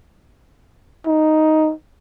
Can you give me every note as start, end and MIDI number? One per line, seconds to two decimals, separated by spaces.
1.07 1.73 63